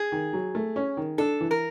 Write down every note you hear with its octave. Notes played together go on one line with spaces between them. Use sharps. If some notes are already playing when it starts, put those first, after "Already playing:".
Already playing: G#4
D#3
F#3
A3
C#4
D#3
D4 A4
E3
A#4